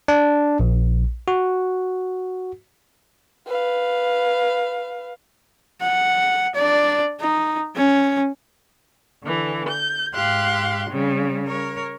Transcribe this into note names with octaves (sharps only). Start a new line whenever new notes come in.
D4
A#1
F#4
B4 F5
F#5
D4 D5
D#4
C#4
D3 E3
G6
G#2 G4 F5 C6 F#6
C#3 G3 C4
A#4 C#5